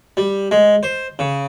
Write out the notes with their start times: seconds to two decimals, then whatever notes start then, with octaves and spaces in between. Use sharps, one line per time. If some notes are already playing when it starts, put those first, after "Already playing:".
0.17 G3
0.51 G#3
0.83 C5
1.19 C#3